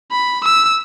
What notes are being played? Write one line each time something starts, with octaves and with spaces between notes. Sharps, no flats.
B5
E6